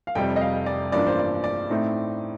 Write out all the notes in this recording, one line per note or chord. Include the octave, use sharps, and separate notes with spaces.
F5
F1 F2 C3 G3 G5
D#5
F5
D5
A1 G2 F3 A#3 D4 D5
C5
D5
D5
A2 A3 C4 D#4